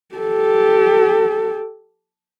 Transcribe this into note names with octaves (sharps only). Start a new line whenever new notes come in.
G4 A4